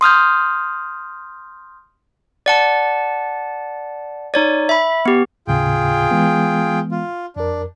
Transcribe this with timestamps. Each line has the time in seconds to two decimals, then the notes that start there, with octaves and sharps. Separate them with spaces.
0.01 C6 D#6 F6 G6
2.46 D5 F#5 A5
4.34 D#4 C#5 D5
4.69 E5 B5
5.06 B3 G4
5.47 D#2 A2 C#3 F4 G#4 G5
6.11 E3 G#3 B3
6.91 F4
7.36 F2 D4 A#4